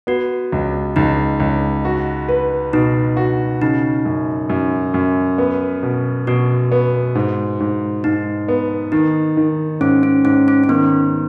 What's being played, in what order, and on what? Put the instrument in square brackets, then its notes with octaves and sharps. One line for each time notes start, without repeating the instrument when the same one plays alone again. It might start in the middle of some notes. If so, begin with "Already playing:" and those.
[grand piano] B3 [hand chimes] F#4
[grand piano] C#2
[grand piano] C#2 [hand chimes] D#4
[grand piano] C#2
F#4
B4
[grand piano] B2 [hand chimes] D#4
[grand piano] F#4
[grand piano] C#3 [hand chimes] D#4
[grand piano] F#2
F#2
F#2
B3
B2
[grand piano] B2 [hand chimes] F#4
[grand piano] B3
G#2
G#2
[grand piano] G#2 [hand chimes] D#4
[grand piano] B3
[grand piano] D#3 [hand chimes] D#4
[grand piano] D#3
[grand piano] G#2 [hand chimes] C#4
[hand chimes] C#4
[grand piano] G#2 [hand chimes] C#4
[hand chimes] C#4
C#4
[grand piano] D#3 [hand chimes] B3